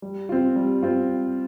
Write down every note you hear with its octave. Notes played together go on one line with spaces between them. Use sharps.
G3
C4 F4
G3
C4 F4